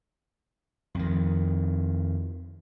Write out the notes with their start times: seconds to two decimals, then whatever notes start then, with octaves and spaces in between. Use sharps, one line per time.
0.95 F2 D#3